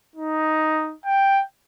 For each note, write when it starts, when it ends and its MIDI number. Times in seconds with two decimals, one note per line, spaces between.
0.16 0.95 63
1.06 1.42 79